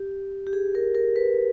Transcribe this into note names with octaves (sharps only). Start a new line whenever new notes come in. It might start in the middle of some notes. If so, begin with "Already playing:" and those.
Already playing: G4
G4
G#4
A#4
A#4
B4